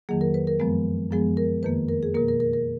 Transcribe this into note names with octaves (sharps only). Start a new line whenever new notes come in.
F2 D#3 F#3 A#3 G#4
A#4
B4
A#4
F#2 F3 G#3 B3
F#2 F3 G#3 B3 G#4
A#4
F2 D#3 A#3 B4
A#4
G#4
B2 A#3 A#4
A#4
A#4
A#4